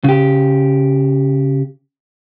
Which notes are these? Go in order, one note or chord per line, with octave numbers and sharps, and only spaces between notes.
C#3 G4